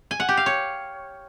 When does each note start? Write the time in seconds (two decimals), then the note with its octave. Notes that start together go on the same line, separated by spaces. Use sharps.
0.11 G#5
0.20 F#5
0.29 G4
0.37 F5
0.46 C#5